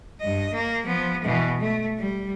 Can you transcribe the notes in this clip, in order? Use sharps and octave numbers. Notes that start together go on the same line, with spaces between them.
G2 D#5
A#3
F3 B3
B2 E3
A3
G3